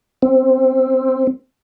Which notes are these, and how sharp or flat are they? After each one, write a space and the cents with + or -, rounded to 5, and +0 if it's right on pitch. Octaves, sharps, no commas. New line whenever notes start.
C4 +5